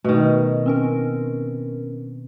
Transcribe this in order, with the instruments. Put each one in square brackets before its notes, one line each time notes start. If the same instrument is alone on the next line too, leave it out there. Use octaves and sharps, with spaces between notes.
[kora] B2 D#3 [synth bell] A3
[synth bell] C4 C#4 A#4